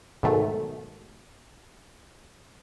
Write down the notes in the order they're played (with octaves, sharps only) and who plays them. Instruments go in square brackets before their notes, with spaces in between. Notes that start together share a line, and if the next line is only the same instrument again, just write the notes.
[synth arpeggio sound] G#2 B2 D#3 F#3 A3